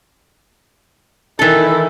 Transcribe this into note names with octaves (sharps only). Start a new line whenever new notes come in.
D#3 E3 E4 A4